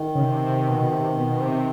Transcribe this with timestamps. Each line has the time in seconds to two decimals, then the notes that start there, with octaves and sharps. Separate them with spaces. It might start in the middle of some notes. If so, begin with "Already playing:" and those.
Already playing: D#3
0.15 C#3
0.23 C3
0.69 B2
0.82 B2
0.93 C3
1.18 B2
1.40 C3